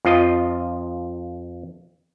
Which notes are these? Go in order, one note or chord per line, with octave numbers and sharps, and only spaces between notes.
F2 F3 F4 D#5